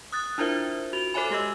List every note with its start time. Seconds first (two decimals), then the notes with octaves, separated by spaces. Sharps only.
0.12 D#6 F#6 A6
0.38 D4 E4 F4 A#4 C5 E5
0.93 F#4 F7
1.14 A4 C5 C#5 E5 G#5 B5
1.30 G#3 G4 D#5 E6